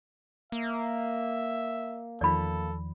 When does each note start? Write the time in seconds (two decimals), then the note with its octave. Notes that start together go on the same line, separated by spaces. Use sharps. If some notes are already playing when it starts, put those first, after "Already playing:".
0.52 A#3 E5
2.21 E2 D#3 F3 A4 D5 B5